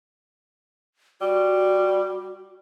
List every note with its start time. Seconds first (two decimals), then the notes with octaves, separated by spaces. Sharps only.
1.21 G3 F#4